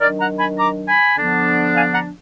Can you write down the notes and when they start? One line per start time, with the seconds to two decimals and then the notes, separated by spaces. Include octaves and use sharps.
0.01 D#3 F#3 D4 A#4 D5
0.19 F#5 A#5
0.39 G#5 B5
0.58 A#5 D6
0.87 G#5 B5
1.17 D3 F3 B3 D4
1.75 F5 G#5
1.94 F#5 A#5